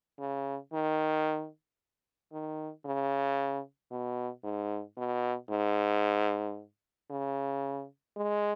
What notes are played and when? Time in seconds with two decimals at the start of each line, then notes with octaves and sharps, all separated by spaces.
0.20 C#3
0.73 D#3
2.33 D#3
2.85 C#3
3.92 B2
4.44 G#2
4.97 B2
5.51 G#2
7.11 C#3
8.17 G#3